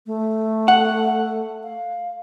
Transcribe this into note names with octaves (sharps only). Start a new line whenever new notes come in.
A3
F#5
F5